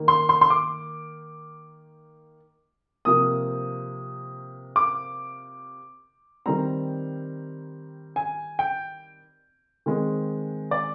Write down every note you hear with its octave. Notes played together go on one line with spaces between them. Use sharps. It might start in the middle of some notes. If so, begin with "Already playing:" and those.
Already playing: D#3 A#3
C6
C6
C6
D6
C3 F3 A#3 D#6
D6
D#3 G3 C4 A#5
G#5
G5
D#3 G#3 C4
D5